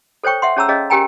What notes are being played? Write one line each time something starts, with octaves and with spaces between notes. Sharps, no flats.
A4 C5 C#5 G5 C#6
E5 F#5 C6
C#4 G#4 C#5 A5 A#5 E6
C#4 G#4 C#5 D#5 F5
C#4 G4 A#4 G5 G#5 A#5